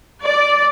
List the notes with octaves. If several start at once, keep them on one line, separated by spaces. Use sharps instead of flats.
D5